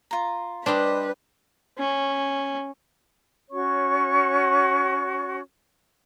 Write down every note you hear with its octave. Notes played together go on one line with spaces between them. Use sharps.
F4 A#5
G3 D4 B4 C5 D#5
C#4
C#4 F#4 C#5 C#6